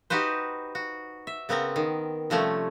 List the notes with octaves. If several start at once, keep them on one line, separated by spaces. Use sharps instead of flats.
D#4 F#4 G4 B4 C5
F#4
E5
C#3 B3 C4 A#4
D#3
C3 F3 G3 A3 C#4